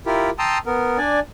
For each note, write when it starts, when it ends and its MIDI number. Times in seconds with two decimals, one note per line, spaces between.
0.06 0.30 64
0.06 0.30 65
0.06 0.30 67
0.06 0.30 70
0.39 0.58 79
0.39 0.58 81
0.39 0.58 82
0.39 0.58 84
0.39 0.58 87
0.39 0.58 88
0.66 0.98 59
0.66 0.98 70
0.98 1.20 62
0.98 1.20 74
0.98 1.20 80